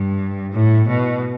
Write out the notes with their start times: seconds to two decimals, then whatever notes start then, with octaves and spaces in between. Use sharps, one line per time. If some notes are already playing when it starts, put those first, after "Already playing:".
Already playing: G2
0.51 A2
0.87 B2